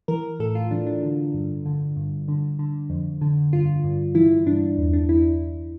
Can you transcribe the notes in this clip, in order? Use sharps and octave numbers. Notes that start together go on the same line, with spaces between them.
E3 A#4
A2 A4
F4
E3 D4
D4
D3
G2
D3
G2
D3
D3
F2
D3
G2 F4
G2
E3 E4
G2 D4
E2
D4
E2 E4